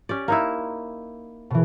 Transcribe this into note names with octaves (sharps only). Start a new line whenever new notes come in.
C#4 G4 D5
A#3 D#4 E4
B2 E3